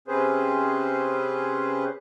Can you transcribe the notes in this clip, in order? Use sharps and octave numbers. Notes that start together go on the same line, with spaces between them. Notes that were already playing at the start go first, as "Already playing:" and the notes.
C3 C4 C#4 G#4 B4 C5